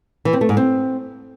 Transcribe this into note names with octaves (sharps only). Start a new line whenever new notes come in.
E3
C4
A3
G#2
C4